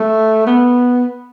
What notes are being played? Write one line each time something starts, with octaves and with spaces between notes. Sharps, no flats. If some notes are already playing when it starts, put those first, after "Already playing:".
Already playing: A3
B3